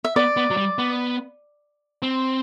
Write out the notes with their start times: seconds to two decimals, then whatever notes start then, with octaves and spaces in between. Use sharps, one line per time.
0.04 E5
0.16 B3 D5
0.37 B3
0.50 F#3
0.57 G3
0.78 B3
2.02 C4